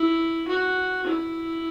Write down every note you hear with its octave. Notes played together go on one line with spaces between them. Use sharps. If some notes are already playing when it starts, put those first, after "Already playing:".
Already playing: E4
F#4
E4